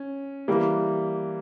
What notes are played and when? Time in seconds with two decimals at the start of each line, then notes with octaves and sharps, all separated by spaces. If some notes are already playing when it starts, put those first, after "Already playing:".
Already playing: C#4
0.48 E3 G3 A#3